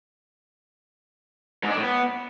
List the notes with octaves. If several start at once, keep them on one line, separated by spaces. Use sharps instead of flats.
G#2
D4
A2
B3